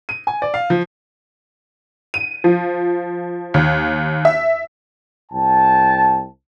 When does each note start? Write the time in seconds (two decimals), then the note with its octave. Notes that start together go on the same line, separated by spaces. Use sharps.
0.09 D#7
0.27 G#5
0.42 D5
0.54 F5
0.70 F3
2.14 D#7
2.44 F3
3.54 D#2
4.25 E5
5.31 C2 G5 A5